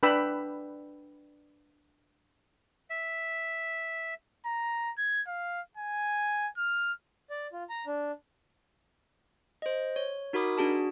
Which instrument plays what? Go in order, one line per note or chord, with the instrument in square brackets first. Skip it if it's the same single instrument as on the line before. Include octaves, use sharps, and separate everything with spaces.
[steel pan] D4 B4 G5 B5 E6
[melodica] E5
[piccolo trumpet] A#5
G#6
F5
G#5
F6
[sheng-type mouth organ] D5
F4
A#5
D4
[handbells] C5 D#5
C#5
D#4 F#4 A#4 B5 D6 D#6
D4 F#4 G#4 A5